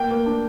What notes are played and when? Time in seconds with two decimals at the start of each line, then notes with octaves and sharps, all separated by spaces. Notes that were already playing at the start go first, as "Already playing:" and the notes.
Already playing: A#3 G5
0.10 A#3
0.26 D4